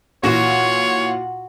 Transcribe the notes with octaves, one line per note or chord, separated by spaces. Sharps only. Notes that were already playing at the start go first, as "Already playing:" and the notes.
A#2 E3 F4 F#4 C#5 F#5